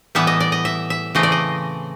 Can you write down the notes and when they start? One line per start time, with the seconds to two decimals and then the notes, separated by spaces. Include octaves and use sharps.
0.15 A2 E3 G3 B3 E5
0.27 D#5
0.40 D5
0.52 D#5
0.65 E5
0.90 E5
1.15 C#3 E3 A3 C4 D#5
1.23 D5
1.32 D#5